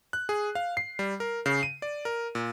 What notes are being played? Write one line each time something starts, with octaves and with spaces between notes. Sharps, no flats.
F#6
G#4
F5
C7
G3
A#4
C#3
D#7
D5
A#4
A#2